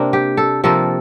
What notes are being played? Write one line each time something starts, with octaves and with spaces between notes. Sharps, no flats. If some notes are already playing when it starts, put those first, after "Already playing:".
Already playing: C3 A#3 C4 D4
G4
A4
C3 F3 A#3 A4